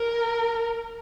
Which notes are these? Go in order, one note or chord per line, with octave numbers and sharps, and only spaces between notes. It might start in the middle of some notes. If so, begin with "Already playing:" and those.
Already playing: A#4